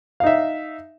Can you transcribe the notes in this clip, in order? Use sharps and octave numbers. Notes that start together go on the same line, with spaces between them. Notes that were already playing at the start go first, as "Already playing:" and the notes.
D#4 E5 F5